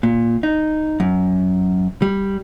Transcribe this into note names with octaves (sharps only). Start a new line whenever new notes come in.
A#2
D#4
F#2
G3